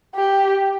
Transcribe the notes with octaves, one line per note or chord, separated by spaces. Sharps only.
G4